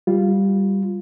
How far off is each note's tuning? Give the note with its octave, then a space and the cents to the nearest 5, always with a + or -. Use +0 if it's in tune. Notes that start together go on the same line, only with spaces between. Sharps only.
G3 +0 F4 +0